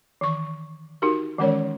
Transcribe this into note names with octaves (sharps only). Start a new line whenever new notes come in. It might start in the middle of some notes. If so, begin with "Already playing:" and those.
D#3 E3 C#6
D#4 F#4 G4 A#4
D#3 E3 G#3 C#4 A#4 C#5